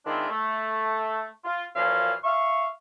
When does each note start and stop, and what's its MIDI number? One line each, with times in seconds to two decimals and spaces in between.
0.06 0.29 51
0.06 0.29 56
0.06 0.29 60
0.06 0.29 62
0.06 0.29 64
0.06 0.29 65
0.30 1.26 57
1.45 1.63 65
1.76 2.13 42
1.76 2.13 46
1.76 2.13 52
1.76 2.13 53
1.76 2.13 61
1.76 2.13 77
2.24 2.67 76
2.24 2.67 77
2.24 2.67 85